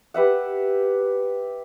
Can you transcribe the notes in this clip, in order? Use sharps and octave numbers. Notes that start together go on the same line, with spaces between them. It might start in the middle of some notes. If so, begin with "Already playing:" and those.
G4 B4 E5 F#5